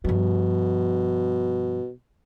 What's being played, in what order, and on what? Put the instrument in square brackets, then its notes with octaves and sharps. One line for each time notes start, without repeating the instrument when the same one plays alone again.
[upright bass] G2 F3 [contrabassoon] B2